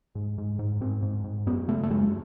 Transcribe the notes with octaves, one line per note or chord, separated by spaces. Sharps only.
G#2
G#2
G#2
G#2 C4
G#2
G#2
F#2 B3
C#3 A3
A3
F#2 G#3